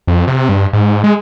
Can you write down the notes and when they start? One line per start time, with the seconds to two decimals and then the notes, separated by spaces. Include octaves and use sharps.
0.07 F2
0.27 C3
0.49 G2
0.73 G#2
1.04 G#3